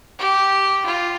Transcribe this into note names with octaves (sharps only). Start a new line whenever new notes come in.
G4
F4